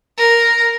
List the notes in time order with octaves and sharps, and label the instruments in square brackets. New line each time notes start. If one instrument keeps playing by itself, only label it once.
[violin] A#4